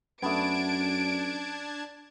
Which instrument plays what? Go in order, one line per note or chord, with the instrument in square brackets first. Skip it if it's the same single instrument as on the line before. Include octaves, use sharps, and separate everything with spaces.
[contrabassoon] F#2 [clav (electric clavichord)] A3 B3 [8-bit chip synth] D4 A5 G#6 [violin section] D7